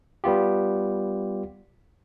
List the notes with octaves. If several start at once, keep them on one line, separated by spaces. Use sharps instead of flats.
G3 B3 F4 G4